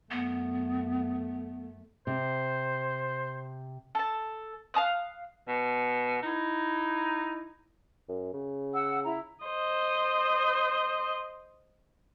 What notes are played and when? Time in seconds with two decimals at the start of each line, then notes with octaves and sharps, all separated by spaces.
0.11 F#2 A3 B3
2.07 C3 C5
3.95 A4 A5
4.74 F5 A5 D#6 F#6
5.48 B2
6.23 D#4 E4
8.09 F#2
8.33 C#3
8.73 F#5 E6
9.04 E4 A#5
9.44 C5 D#5